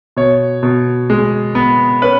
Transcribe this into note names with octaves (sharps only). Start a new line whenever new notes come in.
B2 C#5
B2
G#3
B3
C#4 B4